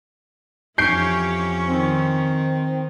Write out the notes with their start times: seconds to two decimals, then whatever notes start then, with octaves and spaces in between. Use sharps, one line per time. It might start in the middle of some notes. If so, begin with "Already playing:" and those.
0.78 F2 E3 C#4 G4 C#5 G6 C7 D7
1.68 D#3 C4 D#4